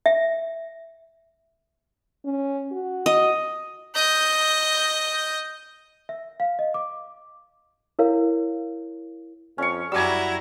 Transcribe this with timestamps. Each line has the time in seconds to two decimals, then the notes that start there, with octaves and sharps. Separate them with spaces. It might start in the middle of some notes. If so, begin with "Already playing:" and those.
0.06 E5
2.25 C#4
2.72 F#4
3.06 D#5
3.95 D#5 G6
6.09 E5
6.40 F5
6.59 D#5
6.74 D6
7.99 E4 A#4 C#5 F5
9.58 F2 C#4 C#6
9.92 F#2 G3 E4 F#4 G#5 A#5 D6 E6